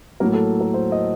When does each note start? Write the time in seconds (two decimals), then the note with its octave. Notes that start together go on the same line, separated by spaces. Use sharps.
0.20 A2 F#3 A#3 A#4
0.33 A4
0.61 A#4
0.74 C5
0.92 D#5